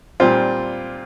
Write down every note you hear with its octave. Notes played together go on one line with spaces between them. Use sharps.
A#2 G3 C4 F4